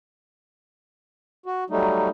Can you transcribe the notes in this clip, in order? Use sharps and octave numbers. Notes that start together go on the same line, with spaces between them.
F#4
F#3 G3 A3 D#4